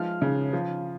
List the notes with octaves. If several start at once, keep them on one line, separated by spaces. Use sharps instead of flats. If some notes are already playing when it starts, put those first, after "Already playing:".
Already playing: F3 G#3 F6
C#3
F3